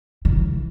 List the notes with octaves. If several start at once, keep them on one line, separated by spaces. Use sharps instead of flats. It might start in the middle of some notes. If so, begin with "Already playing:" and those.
D3
E3